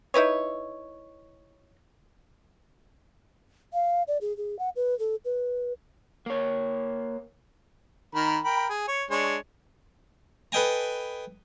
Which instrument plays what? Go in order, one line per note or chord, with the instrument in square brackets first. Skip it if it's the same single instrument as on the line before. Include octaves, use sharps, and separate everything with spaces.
[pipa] D#4 E4 B4 C#5
[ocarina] F5
D5
G#4
G#4
F#5
B4
A4
B4
[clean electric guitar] A#3 C#5
[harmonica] D#3 A#4 B5
A#4 G5 B5
G#4
C#5
G#3 D4 C#5
[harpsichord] A4 B4 D#5 G5 G#5 A#5